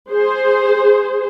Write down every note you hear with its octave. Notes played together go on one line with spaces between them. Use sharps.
G#4 C5